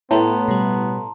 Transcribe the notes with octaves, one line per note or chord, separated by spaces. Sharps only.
A2 B3 A4 B4 G5 A5 A#5 C6
B2 G3